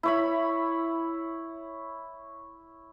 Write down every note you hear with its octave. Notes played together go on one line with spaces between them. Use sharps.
E4 C#5 B5